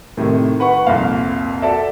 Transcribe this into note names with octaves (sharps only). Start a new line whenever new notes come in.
A2 C3 D#3
B4 F#5 B5 C#6
C2 F2 A#2 F5
F#4 A4 D5 E5